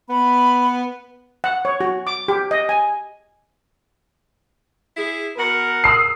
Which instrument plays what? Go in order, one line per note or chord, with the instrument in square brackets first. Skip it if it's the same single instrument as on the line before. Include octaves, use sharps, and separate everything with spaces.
[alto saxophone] B3 [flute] B5
[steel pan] F#5
C#5
F#4
D6
G4
D#5
G#5
[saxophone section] E4 G#4
[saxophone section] B2 F#5 [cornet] A#4
[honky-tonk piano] D#6 E6 C7